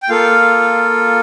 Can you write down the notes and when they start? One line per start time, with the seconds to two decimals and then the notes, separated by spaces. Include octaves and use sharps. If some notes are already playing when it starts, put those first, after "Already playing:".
0.03 G5
0.09 A#3 F4 A4 F5